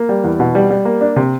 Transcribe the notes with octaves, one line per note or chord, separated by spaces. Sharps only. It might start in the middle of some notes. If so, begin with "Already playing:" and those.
Already playing: A#3
G3
E2
B2
G3
G3
A#3
D4
C3